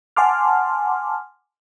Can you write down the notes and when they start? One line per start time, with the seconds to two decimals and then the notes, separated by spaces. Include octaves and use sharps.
0.16 F#5 G#5 A5 C6 D6 F6